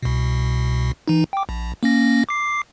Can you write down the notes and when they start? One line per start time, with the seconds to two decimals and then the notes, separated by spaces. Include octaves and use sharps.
0.03 C2 B2
1.08 E3 D#4
1.33 G5 D6
1.49 A#1
1.83 A#3 C#4 A#6
2.29 D6 C7